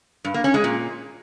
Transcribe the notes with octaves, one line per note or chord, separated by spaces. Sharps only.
G2
A#3
C#4
G#3
A#2